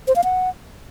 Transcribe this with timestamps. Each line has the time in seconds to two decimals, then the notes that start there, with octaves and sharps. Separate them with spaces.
0.08 C5
0.16 F5
0.24 F#5